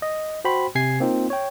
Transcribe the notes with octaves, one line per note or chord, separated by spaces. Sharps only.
D#5
F#4 C5 G5 B5 C6
C3 G#5 G#6 C7
A#3 C4 D#4 F4
C#5 G5